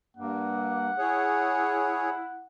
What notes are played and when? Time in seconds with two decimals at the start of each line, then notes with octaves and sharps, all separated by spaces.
0.17 G2 A#3 F#5
0.98 E4 G#4 C#5